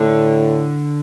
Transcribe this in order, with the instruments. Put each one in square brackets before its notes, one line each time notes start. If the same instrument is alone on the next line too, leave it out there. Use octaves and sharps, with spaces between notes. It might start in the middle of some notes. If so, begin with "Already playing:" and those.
Already playing: [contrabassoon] A2 [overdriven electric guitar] D3